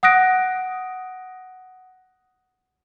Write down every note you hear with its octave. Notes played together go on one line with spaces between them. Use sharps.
F#5 D#6 F#6 A#6 D7